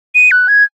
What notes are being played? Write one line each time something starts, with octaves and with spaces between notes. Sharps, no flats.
D#7
F#6
G#6